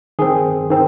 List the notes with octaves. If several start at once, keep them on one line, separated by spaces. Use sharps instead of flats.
D#3 C4 G#4
D#3 C4